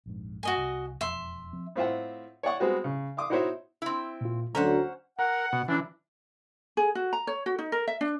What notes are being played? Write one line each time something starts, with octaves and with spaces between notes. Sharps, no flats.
A#1 F2 G#2
G2 F#4 D#5 G#5
C2
E1 F2 E5 C6
F3 C4
A2 C4 F4 E5 F#5
C#5 D5 F#5 C#6
G3 G#3 B3 C4 F#4
C#3
F5 C6 D6 D#6
D#4 E4 F#4 C5 C#5 E5
C4 E4
A#2 F4
D2 D3 F#3 C#4 C5 F#5 A#5
A#4 F#5
B2
E3 F#3 C#4 D4
G#4
F#4
A#5
C#5
F#4
D#4
A#4
E5
D4